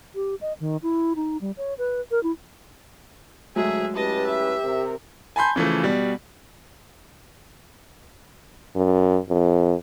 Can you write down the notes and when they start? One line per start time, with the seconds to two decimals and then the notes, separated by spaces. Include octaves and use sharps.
0.15 G4
0.41 D#5
0.60 D#3
0.83 E4
1.16 D#4
1.41 G3
1.57 C#5
1.78 B4
2.11 A#4
2.23 E4
3.56 D2 F#3 G#3 A3 G#4 E5
3.96 C#4 E4 G4 B4 D#5 A5
4.27 E5
4.63 C3 A#4
5.36 G#5 A5 B5 C6 G6
5.56 C#3 E3 F3 A3
5.83 B2 G3
8.76 F#2
9.29 F2